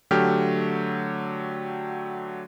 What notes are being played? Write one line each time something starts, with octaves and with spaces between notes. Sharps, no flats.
D3 F#3 A3 G4 F6